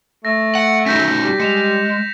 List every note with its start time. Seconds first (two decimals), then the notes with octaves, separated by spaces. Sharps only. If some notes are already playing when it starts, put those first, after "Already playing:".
0.25 A3 A#6
0.55 F#5
0.86 C#4 D#4 F#4 G6 A#6 B6
1.23 G3
1.40 G#3 C#7 E7 F7